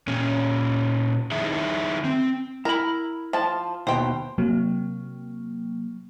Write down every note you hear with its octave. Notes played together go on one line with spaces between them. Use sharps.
A#2 C#4
D#3 D#4 E4 G#4 E5
C4
E4 A#4 B5
F3 A5
D#2 B2 C5 G5
C3 F#3 A#3